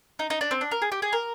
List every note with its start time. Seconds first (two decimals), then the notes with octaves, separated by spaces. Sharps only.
0.19 D#4
0.30 D#4
0.41 D4
0.51 C4
0.61 D4
0.71 A#4
0.82 G#4
0.92 G4
1.02 G#4
1.13 A#4